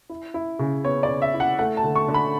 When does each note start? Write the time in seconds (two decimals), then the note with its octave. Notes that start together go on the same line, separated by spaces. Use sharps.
0.09 E4
0.34 E4
0.59 C#3
0.84 B3 C#5
1.03 D5
1.09 C#3
1.22 E5
1.34 E4
1.40 F#5
1.59 A3 F#5
1.77 A5
1.84 D3
1.95 C#6
2.08 D3
2.14 B5